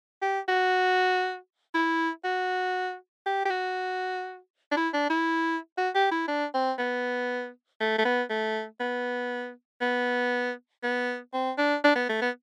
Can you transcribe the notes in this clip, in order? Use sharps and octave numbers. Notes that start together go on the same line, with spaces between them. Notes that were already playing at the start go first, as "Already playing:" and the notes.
G4
F#4
E4
F#4
G4
G4
F#4
D4
E4
D4
E4
F#4
G4
E4
D4
C4
B3
A3
A3
B3
A3
B3
B3
B3
C4
D4
D4
B3
A3
B3